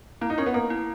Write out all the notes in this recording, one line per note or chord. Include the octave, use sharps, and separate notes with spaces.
A#3 E4
D#4
C#4 A#4
B3
A#3 A#4
E4